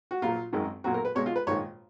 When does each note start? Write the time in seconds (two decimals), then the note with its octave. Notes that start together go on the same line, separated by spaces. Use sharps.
0.11 F#4
0.22 A#1 A#2 F#3 F4
0.53 G#1 F#2 D#3 G#3
0.84 B1 A#2 F#3 F#4
0.94 A#4
1.05 B4
1.15 B1 B2 G#3 C#5
1.26 F4
1.36 B4
1.47 A#1 G#2 D#3 G#3 C#5